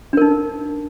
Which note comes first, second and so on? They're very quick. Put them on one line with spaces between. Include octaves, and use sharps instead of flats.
D4 A#4 D#4